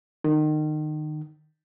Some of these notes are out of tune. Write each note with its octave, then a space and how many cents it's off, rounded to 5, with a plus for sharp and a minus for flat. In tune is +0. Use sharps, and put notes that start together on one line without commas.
D#3 -30